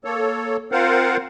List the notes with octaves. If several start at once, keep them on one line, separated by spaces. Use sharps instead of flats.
A#3 A4 C#5
C4 F4 A#4 C5 F5 F#5